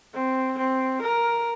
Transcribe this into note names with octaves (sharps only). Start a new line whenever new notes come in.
C4
C4
A#4